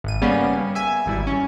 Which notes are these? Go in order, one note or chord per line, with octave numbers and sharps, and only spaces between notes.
G#1 D#7
C#3 G3 A#3 B3 C#4
E5 G#5
G#1 G3 E4
C#4